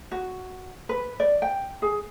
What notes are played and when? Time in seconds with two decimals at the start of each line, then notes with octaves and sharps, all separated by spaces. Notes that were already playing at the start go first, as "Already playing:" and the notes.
0.12 F#4
0.89 B4
1.20 D5
1.42 G5
1.82 G#4